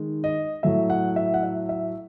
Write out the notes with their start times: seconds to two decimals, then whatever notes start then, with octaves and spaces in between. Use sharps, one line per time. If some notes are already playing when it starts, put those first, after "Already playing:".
Already playing: D#3 G#3
0.24 D#5
0.63 A2 F#3 A3 E5
0.90 F#5
1.16 E5
1.34 F#5
1.43 E5
1.69 E5